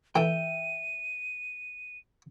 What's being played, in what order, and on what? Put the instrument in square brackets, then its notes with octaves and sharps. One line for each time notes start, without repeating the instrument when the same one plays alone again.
[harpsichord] E3 A3 [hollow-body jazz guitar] E5 G5 [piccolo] D#7